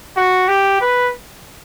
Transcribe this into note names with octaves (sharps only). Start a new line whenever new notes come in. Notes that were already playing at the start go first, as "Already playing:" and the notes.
F#4
G4
B4